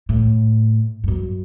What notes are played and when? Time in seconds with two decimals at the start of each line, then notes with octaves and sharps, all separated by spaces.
0.09 A2
1.04 G2
1.08 F#2